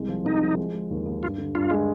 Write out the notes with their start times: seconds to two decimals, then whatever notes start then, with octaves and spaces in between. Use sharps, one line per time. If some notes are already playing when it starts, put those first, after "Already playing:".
Already playing: C2 G#3
0.09 F3
0.25 C2 D#4
0.42 F3
0.57 G#3
0.73 G#3
0.91 D#2
1.06 D#2
1.23 G2 F4
1.38 D3
1.55 G2 F4
1.71 G#3